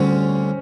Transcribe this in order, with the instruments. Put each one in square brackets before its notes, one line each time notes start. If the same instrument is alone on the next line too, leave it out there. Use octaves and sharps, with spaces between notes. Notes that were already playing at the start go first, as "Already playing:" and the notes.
Already playing: [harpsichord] D2 D3 G3 [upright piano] C4 C#4